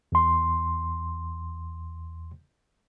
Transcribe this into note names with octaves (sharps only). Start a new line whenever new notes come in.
E2 C6